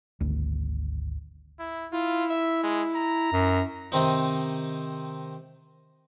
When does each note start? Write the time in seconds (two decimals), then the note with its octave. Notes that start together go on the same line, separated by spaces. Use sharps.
0.21 G#1 D2
1.59 E4
1.93 E4 F4
2.30 E5
2.63 G#3
2.95 A#5
3.32 F#2
3.92 C3 D#3 C4 D#4